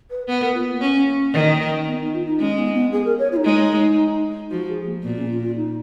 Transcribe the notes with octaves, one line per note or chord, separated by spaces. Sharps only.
B4
B3 B4
A#4
F4
B3
A#3
C#4
D#3
B3
D#4
F4
D#4
G#3 C#4
B3
B3
G#4
A#4
C#5
F4
D#4
G#3
F3 F#4
G#4
A#3
A#2 B3
C#4
F4
F4
D#4